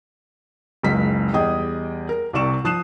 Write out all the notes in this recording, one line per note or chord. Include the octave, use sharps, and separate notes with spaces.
F#1 C#2 B6
E2 G3 G#4 D#5 G5 D#6
A#4
C2 C3 D5 C#6 E7
F3 D#6 F#6 C7 E7